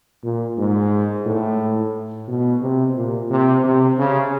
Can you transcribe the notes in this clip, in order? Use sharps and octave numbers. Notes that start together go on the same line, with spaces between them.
A#2
G#2
A2
B2
C3
A#2
C3
C3
C#3